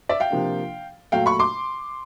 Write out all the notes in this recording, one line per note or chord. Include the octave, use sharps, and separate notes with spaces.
D5 E5
F5 G5
C3 F3 A#3 D4
A#2 F#3 A3 F5 G5
B5 C#6
C6 D6